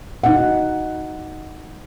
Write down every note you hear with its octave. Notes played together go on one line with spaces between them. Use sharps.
D#4 F#5